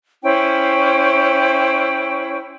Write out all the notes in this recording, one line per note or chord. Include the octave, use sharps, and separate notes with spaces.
C#4 E4 C5 G5